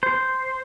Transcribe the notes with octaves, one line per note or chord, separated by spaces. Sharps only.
C5